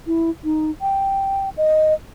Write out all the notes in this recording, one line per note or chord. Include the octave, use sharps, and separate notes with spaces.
E4
D#4
G5
D#5